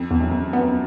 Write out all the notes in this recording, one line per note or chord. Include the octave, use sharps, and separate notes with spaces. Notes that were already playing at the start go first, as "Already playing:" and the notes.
Already playing: F2
E2
F#2
E2
F#2 B3